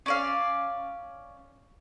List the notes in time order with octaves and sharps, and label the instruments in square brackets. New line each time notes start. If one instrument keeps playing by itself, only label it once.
[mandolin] C#4 D5 F5